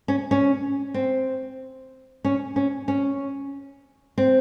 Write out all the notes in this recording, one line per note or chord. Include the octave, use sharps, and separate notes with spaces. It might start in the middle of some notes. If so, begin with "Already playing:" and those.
C#4
C#4
C4
C#4
C#4
C#4
C4